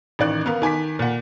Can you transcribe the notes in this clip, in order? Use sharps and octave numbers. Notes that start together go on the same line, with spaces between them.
A1 D#3 D5 F#6
B3 A#4 F5
D#3 G#5 D6 B6
A#2 F#5